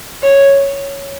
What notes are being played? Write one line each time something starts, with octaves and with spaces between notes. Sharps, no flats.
C#5